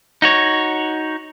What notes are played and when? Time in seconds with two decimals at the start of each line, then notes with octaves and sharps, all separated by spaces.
0.22 D#4 F#4 C#5